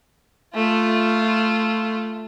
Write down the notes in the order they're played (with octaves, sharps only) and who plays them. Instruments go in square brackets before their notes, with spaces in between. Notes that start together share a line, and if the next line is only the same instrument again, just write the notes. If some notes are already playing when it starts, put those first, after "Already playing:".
[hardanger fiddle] A3 F4